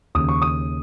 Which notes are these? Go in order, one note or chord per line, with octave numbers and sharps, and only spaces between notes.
D#2 C#3 D#6
C#6
D#6